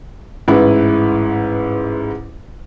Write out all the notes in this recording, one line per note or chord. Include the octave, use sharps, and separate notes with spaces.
A1 G#2 E4 B4